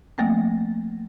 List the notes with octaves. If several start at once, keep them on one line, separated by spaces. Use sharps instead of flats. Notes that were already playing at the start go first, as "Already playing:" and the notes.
F3 A3 A#3 C4